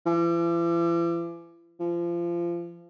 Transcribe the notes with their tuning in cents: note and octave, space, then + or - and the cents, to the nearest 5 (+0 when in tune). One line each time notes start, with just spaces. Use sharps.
E3 +45
F3 -25